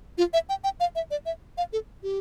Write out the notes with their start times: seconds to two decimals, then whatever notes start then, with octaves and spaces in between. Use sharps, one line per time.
0.18 F4
0.33 E5
0.49 G5
0.64 G5
0.80 F5
0.95 E5
1.11 D5
1.26 E5
1.58 F5
1.73 A4
2.03 G4